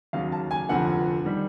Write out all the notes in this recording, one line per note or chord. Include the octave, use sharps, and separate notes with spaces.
D#2 C#3 F#3 F5
A5
G#5
F1 F2 D3 F3 F#5
D#3 G3